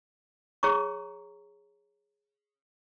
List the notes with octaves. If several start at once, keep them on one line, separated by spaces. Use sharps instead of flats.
G#4 C#5 A#5 C#6